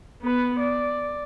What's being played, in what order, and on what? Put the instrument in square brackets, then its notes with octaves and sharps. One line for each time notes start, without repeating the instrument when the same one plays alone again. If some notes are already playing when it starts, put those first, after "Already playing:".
[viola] B3 B4
D5